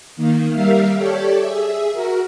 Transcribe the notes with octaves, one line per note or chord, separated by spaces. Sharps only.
D#3 A#3
G3 A#4 E5 F5
G4 A4 C#5 D5
G#4 E5
F#4 A#4